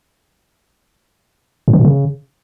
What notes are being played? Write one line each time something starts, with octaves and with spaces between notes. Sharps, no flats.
A2
D#3
A#2
C#3